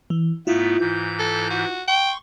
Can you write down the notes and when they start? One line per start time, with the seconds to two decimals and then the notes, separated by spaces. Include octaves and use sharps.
0.10 E3
0.47 G#2 A3 B3 E4 F4
0.80 G#2 E3 G6
1.19 A4
1.50 F#4
1.88 G5 C6 C#6